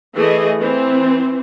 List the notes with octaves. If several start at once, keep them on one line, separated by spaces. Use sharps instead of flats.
E3 A3 G#4 D#5
E3 C4